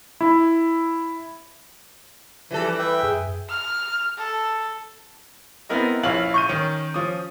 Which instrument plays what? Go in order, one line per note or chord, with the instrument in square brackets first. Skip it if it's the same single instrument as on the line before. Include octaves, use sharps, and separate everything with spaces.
[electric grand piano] E4
[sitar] E3 G3 A4 [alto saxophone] F3
[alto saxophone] B4 [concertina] E5 G5
[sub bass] F#2 [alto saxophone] G#4
[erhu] F6
A4
[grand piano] B3 C4 E4 A#4 D#5
A#1 C#4 E4 F4 F5 F#7
C#6 G6 D#7
D#3 C#4
F3 C#4 D#6